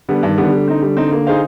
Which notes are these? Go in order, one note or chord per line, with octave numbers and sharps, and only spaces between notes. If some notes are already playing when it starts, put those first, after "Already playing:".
D3 G3 B3
G2 D#3
D3 G3 B3
D3 G3
C4 D#4
G3
C4 D#4
A#3
D#4 G#4 C5 F5